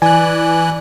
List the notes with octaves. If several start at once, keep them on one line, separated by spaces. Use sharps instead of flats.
E3 D5 G#5 F#6